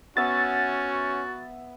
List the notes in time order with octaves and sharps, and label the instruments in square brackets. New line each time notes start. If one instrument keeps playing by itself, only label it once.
[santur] B3 E5 [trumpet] C#4 [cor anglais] F#4 [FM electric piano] A6